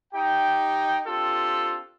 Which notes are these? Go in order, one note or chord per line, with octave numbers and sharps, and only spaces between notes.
D#4 G4 G5
C4 D4 F4 G4 A4